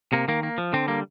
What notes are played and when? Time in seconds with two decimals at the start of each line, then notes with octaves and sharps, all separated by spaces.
0.13 C3 A#3
0.28 D#3 A#3
0.43 A#3
0.58 F3
0.73 D3 C4
0.88 G3 A#3